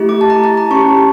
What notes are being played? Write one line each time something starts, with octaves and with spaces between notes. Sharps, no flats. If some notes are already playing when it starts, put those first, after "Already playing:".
Already playing: A3 E4 G4
D6
A5
A#5
A5
A#5
C#4 G4 C#6